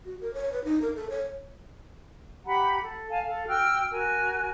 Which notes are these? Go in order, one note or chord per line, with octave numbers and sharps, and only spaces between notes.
F#4
A#4
C#5
B4
D#4
A#4
A4
C#5
G4 F#5 A#5 B5
A4
F5 G#5 A5
A4 F5
F#4 G5 E6 F6
F#4 A#4 G#5